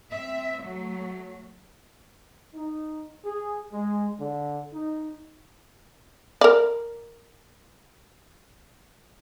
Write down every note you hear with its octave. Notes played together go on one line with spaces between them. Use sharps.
C4 E5
F#3 A3
D#4
G#4
G#3
D3
D#4
A#4 D5